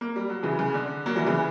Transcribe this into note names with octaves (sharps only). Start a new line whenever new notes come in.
A#3
G3
F#3
C#3 E3
C#3
D3
F#3 A#3
E3 G3
C#3 E3